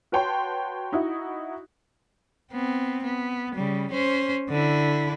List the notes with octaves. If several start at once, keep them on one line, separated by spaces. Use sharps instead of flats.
F#4 B4 C#5 G5 A5 C6
D#4 E4 F#4
B3 C4
B3
C#3 G3
C#4 C5
D3 E4